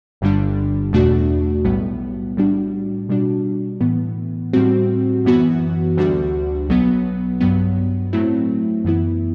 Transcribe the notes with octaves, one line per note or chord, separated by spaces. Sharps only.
G1 G2 D3 G3 D4
E2 B2 A3 D4 F#4
B1 A2 G3 B3
A2 G3 D4 F#4
B2 G3 D4 F#4
A2 E3 B3
A2 G3 C4 F#4
F#2 E3 B3 F#4
D2 D3 G3 D4 F#4
B1 B2 F#3 B3
G2 F#3 B3
A2 F#3 A3 C4 E4
F#2 E3 B3 E4